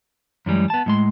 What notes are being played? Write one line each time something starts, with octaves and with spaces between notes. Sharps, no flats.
F#2 E3 G3 G#3
B3 A5
A2 G#3 C6